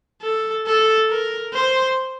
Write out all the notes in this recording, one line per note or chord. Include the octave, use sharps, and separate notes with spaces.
A4
A4
A#4
C5